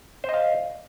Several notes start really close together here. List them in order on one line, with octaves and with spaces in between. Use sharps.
C5 D#5 F5